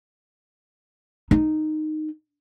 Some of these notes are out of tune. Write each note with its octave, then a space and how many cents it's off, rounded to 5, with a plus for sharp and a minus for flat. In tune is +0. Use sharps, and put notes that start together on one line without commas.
D#4 -10